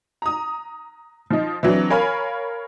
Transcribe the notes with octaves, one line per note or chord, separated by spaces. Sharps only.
A#5 D#6
F3 D#4
E3 F#3 C4 D4
A#4 C#5 F5 G#5 B5